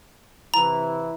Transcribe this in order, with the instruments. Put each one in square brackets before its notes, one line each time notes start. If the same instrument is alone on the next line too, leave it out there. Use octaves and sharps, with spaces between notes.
[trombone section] C3 E3 E4 [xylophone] A#5